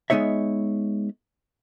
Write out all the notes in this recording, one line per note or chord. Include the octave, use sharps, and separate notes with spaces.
G#3 B3 D#4 C#5 E5